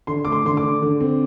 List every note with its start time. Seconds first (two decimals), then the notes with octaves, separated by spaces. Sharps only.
0.07 D3 C6
0.25 A3 D6
0.32 C6
0.45 D3 C6
0.57 D6
0.63 D3
0.82 D3
1.00 C4